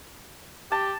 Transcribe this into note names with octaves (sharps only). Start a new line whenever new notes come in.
G4 A5